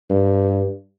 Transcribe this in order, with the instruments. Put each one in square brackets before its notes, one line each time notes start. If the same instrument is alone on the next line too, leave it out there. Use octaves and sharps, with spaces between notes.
[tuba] G2